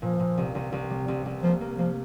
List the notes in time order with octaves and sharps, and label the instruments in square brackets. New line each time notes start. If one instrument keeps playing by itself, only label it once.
[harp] A#2 [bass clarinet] F3
[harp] A#2
C2
C2
C2
G3
C2
C2
[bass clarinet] F3 [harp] A#3
[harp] A#3
[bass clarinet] F3 [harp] A#3